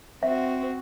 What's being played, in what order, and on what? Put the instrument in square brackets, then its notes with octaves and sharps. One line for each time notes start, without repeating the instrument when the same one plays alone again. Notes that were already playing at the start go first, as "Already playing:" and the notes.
[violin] C4 F#4 [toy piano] E5